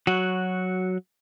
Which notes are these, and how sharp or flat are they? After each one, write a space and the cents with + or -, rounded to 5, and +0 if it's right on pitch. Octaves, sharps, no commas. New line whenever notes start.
F#3 +0 F#4 -5